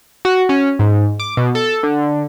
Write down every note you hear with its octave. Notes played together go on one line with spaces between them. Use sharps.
F#4
C#4
G#2
D6
B2
A4
D3